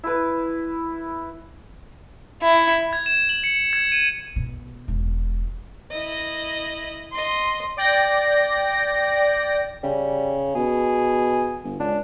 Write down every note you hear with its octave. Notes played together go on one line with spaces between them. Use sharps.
E4 B4
E4
G#6
E7
F#7
C#7
G#6
D#7
B2
E1
E4 D#5
D#5 C6
D5 G5 A#6
C#3 G3
B2 G#4
G1
C#2 D4